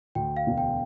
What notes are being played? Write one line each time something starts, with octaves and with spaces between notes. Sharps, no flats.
D2 G5
F5
E1
G5